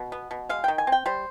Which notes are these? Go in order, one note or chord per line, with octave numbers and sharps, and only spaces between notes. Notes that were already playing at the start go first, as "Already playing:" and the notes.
Already playing: B2
B3
B2
G#3 F5
D#3 G5
G#5
C4
G5
G3 C5